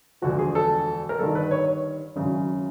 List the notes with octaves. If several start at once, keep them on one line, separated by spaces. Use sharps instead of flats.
E1 D2 D3 F3 F#4
G#4
A4
A#4
G1 G2 D#3 A4
B4
C#5
C#5
G#1 F#2 C#3